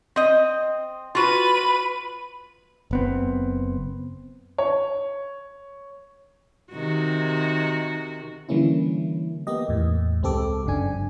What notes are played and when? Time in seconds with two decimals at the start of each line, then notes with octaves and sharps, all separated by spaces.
0.16 C4 D#5
1.15 F4 F#4 B4 D#7
2.91 F#1 B3 C4
4.58 C#5
6.72 C3 D#3 F#4
8.49 D3 E3 G3 A#3 C#4 E4
9.47 A#3 B3 G4 D#5
9.69 E2 A2
10.22 C#2 G#3 C4 G4 A4 D6
10.66 G1 F#2 C#3 D4 G#5